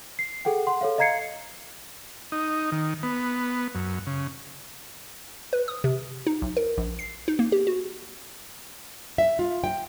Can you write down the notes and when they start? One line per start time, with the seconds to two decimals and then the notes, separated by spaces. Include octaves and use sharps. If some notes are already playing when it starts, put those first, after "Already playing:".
0.19 C7
0.45 G#4 A4 F#5 G5
0.67 F#5 C6
0.81 A4 C#5 F5
0.98 D#5 F5 A#5 G#6 C7 C#7
2.32 D#4
2.72 D#3
3.03 B3
3.75 F#2
4.07 C#3
5.53 B4
5.68 D#6
5.84 C3
6.27 D#4
6.42 B1
6.57 A#4
6.78 A#1
6.99 C7
7.28 D#4
7.39 A#3
7.52 G4
7.67 F#4
9.18 E5
9.39 F4
9.64 G5